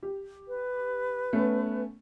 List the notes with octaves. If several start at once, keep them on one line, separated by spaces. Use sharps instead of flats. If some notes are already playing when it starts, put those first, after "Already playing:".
G4
B4
A3 B3 C#4